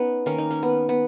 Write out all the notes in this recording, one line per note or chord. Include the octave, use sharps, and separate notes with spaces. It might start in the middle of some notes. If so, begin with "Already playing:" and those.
Already playing: B3 C#4 D#4
D#3 A#3 C#4
D#4
C#4
B3
B3